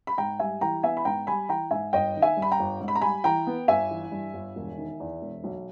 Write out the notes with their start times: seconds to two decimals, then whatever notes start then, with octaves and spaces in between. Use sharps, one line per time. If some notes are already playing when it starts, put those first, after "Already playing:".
0.07 B5
0.18 G#2 G5 A#5
0.39 G3 E5 G#5
0.61 E3 G5 A#5
0.83 B3 E5 G#5
0.97 B5
1.05 G#2 G5 A#5
1.27 G3 G#5 B5
1.49 E3 G5 A#5
1.71 G#2 E5 G#5
1.93 G1 D#5 G5
2.15 D#3
2.22 E5 G#5
2.37 G2
2.42 B5
2.51 G5 A#5
2.59 G1
2.80 G#2
2.88 B5
2.95 A#5
3.01 G3 G#5 B5
3.24 E3 G5 A#5
3.47 B3
3.68 G1 E5 G#5
3.91 E3
4.12 G2
4.34 G1
4.56 E1
4.77 D#3
5.00 E2
5.22 E1
5.44 B1